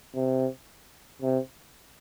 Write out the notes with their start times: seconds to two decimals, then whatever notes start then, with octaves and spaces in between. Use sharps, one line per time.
0.14 C3
1.22 C3